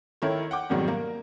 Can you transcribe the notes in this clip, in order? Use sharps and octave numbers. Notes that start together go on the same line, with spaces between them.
D#3 E4 A4 A#4 C#5
F#5 G5 D6
F2 G#2 B2 D#3 F#3 G3
A#3 A#4